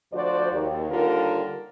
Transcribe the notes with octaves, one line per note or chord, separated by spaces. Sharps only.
D2 F3 F#4 C5 D5
D#2
D#2 D3 G3 F4 A#4